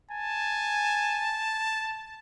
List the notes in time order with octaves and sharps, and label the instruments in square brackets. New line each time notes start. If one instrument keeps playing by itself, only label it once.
[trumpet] G#5 [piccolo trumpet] A5